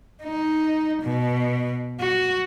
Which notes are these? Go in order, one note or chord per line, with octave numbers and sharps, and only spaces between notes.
D#4
B2
F#4